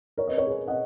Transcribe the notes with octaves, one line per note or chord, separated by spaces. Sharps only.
A#4 C#5
B4 D#5
A#4 C#5
G#4 B4
D#5 F#5